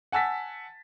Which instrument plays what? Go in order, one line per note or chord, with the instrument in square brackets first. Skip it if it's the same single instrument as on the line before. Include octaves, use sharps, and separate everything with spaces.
[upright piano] F#5 G#5 A5 E6 A6 B6